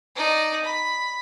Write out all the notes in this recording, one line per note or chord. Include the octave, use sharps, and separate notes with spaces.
D#4 D5
B5